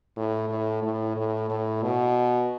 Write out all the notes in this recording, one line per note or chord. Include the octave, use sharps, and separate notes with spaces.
A2
A2
A2
A2
A2
B2